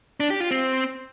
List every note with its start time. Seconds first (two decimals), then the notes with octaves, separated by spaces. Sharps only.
0.20 D4
0.30 G4
0.41 F4
0.51 C4